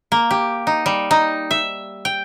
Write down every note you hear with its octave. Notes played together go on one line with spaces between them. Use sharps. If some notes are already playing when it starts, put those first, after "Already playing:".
A#3
G4
D#4
G3
D#4
E5
G5